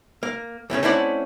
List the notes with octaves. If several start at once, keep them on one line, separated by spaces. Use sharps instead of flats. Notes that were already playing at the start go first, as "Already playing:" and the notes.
A#3
E2 A2 A3 C#4
A3 C4 C#4 E4 D5 F#5